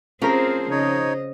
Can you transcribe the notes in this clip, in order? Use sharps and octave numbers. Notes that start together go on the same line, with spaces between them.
F3 C4 C#4 G#4 A#4 C5
C#3 D#4 C#5 D#5